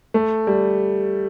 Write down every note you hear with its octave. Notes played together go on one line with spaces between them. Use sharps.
A3
G3